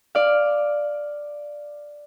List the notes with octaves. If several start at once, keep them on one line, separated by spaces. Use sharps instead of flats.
D5 F5